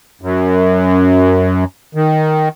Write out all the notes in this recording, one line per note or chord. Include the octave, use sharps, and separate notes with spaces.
F#2
D#3